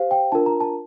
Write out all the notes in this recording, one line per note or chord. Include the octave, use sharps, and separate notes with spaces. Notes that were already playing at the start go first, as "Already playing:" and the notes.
Already playing: G4 C5 F5
G5
D4 F4 A#4 A5
A#5
A5